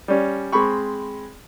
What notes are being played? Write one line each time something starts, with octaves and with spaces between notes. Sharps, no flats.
G3 C#4
G#3 C4 B5 C#6